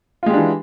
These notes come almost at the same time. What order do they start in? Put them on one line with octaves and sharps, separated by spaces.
F4 G#3 G4 D4 E3